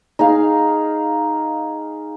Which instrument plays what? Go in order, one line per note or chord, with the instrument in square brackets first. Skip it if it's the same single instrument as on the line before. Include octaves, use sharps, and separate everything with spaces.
[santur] D#4 G#4 F5